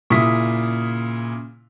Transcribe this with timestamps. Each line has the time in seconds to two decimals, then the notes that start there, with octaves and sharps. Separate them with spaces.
0.10 A#2 C#3 E4 D#6 B6